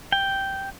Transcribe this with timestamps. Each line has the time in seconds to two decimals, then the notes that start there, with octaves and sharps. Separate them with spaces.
0.12 G5